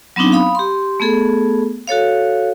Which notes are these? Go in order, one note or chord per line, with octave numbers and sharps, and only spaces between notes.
F#3 B3 C4 D4 D#4
F5 B5 D#6
G4 C6
A3 B3 G#4 A4
F#4 A4 C#5 F5